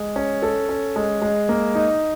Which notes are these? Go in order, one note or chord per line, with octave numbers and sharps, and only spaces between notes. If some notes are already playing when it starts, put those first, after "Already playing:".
Already playing: G#3
C#4
A4
C#4
G#3
G#3
A#3
D#4